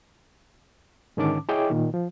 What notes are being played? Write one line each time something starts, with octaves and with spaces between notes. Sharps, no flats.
G#2 D3 D#3 C#4 A5 D6
E4 G#4 C#5 D#5 G5 D6
A#2 D#3
F3